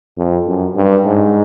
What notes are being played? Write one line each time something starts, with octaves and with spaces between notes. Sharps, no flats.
F2
F#2
G2
G#2